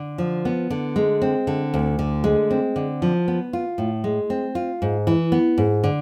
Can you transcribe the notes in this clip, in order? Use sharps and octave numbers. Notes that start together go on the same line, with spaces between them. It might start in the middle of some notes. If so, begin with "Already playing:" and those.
Already playing: D3
F3
B3
D3
G#3
C4
D3
D2
D3
G#3
C4
D3
F3
B3
F4
A2
G#3
C4
F4
G#2
E3
B3
G#2
D3